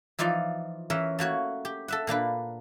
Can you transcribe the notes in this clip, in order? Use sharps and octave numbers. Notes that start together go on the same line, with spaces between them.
E3 F3 D#4 F4 D5
E3 C#4 A#4 E5
A3 A#3 F#4 C#5
G4
A4 E5 F#5
A#2 A#3 D4 B4